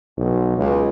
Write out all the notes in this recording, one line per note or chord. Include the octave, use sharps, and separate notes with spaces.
B1
C#2